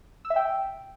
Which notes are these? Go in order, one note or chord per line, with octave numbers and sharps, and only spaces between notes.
E6
E5
G5